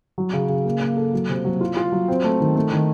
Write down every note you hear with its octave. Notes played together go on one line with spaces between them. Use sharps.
F#3
C#3
C#3
A#3
A#3
A4
F#3
C3
F#3
F4
F4
F#3
C4
A3
D#3
A3
D#3